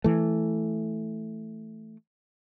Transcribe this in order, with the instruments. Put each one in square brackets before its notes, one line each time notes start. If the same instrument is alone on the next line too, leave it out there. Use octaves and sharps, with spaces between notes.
[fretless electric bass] E3 A3